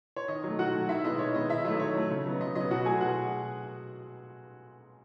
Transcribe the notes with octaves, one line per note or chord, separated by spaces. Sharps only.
C#5
D#3 D#5
F#3 A3
D#3 F#4 F#5
F#3 A3
D#3 E4 E5
G#3 B3 D#5
D#3 C#5
G#3 B3 D#5
D#3 E4 E5
F#3 A3 D#5
D#3 C#5
F#3 A3
C#3
F#3 B3
C#3 D#5
F#3 B3 D#5
B2 F#4 F#5
F#3 A3 G#4 G#5
B2 F#4 F#5